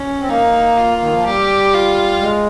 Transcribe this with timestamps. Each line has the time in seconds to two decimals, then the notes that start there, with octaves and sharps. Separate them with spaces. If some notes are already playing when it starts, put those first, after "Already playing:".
Already playing: C#4
0.21 C4
0.29 A#3 D#4
0.77 F4
1.02 D#3
1.13 F3
1.26 G3 G4
1.74 F4
2.21 G#3